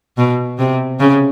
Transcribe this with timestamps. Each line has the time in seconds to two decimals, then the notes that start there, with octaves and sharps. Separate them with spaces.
0.17 B2
0.59 C3
1.00 C#3